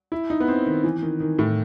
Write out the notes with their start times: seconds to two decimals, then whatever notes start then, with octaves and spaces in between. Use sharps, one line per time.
0.12 E4
0.30 D#4
0.40 B3
0.48 C4
0.66 D#3
0.84 E3
1.02 D#3
1.20 D#3
1.39 A2